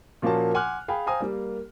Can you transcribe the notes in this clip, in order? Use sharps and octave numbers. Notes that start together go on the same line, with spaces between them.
A#2 F3 A#3 C#4 F#4 A5
F#5 G#5 C6 D6 F6 F#6
G#4 F5 G5 G#5 B5
C5 F5 G5 G#5 A#5 D#6
G3 A#3